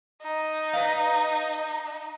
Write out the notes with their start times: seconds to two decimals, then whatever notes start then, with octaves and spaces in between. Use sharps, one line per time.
0.23 D#4
0.74 B4 D5 F5